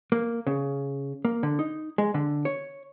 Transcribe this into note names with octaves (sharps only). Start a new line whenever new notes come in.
A#3
C#3
A#3
D3
D#4
G#3
D3
C#5